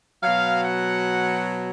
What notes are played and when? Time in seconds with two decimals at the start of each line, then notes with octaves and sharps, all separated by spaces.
0.23 B2 F#3 F5
0.64 F#5